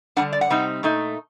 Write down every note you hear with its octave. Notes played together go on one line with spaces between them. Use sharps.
D3 G3 D4 F#5
D5
F#5
C3 G3 C4 D#4
A#2 A3 D#4